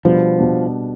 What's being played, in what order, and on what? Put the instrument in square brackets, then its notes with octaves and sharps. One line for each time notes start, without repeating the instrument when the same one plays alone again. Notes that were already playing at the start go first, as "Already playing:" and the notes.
[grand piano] B2 G3 B3 D4 [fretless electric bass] F3
[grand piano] B2 G3 B3 D4